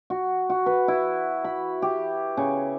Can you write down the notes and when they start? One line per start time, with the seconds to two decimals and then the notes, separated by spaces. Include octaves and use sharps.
0.10 F#4
0.50 F#4
0.66 B4
0.88 E4
1.45 B5
1.82 G4
2.37 C#3